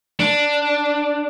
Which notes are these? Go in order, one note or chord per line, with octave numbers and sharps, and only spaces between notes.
D4